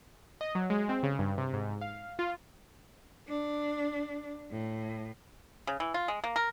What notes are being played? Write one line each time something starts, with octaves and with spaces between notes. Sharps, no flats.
D#5
F#3
G#3
C4
C#3
G2
C3
G#2
F5
F4
D4
A2
C#3
E3
F4
G#3
A#3
A#4